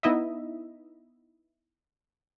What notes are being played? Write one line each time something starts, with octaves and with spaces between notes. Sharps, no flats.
B3 D#4 E4 D#5 E5